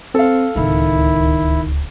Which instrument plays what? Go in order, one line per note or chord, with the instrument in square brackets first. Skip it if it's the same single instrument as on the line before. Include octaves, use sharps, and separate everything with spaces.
[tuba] C4 [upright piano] A4 F5
[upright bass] D1 C#2 [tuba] D#3 [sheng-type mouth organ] E4